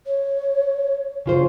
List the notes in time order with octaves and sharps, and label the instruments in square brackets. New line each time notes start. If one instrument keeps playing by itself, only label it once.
[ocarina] C#5
[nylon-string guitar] C#3 F4 C5